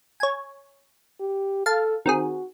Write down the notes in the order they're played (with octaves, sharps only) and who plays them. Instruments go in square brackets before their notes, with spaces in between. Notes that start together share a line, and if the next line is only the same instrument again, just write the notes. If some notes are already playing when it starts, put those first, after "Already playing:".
[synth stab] C#5 G#5
[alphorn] G4
[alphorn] A4 [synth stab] F5 A5
[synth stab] D#3 C4 G#4 [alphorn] F#4